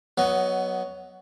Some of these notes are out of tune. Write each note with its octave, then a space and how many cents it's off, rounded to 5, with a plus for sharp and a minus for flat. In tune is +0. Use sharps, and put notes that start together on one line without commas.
F#3 +10 B3 -5 D#5 +0